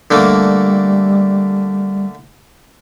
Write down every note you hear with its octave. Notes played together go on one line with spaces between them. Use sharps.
D3 G3 A3 A#3